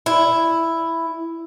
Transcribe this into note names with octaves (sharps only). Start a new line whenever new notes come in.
E4